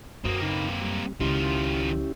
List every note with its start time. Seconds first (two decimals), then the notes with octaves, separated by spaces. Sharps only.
0.25 F#2 A#3 C4 F#4 D#6
0.42 C#3 D#4 B5
0.81 G3
1.20 C#2 D#3 C#4 E4 F4 G4